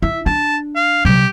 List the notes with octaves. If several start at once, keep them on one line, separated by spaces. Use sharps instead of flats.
E4 E5
D4 A5
F5
C3 F#3 G4